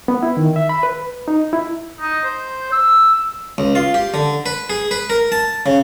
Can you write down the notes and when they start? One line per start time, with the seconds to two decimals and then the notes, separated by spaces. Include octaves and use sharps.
0.08 B3
0.23 E4
0.37 D#3
0.56 E5
0.69 B5
0.83 B4
1.28 D#4
1.53 E4
2.01 D#4
2.24 C5
2.72 E6
3.58 C#2
3.75 F4
3.94 G4
4.14 D3
4.46 B4
4.70 G#4
4.91 B4
5.10 A#4
5.32 A5
5.66 C#3